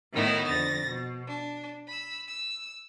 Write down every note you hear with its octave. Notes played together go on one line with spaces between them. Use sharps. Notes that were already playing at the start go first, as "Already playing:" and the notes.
A2 D#3 B3 D#4 E4 F#4
F2 D3 A6 A#6
B2
D4
B5 E6
E6